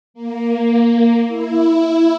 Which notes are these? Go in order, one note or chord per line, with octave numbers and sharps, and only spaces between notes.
A#3
E4